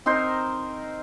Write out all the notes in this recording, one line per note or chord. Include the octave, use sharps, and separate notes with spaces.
C4 D#4 A#4 C5